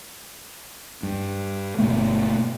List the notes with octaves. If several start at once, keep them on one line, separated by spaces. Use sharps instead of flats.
G2
G1 B2 A3 A#3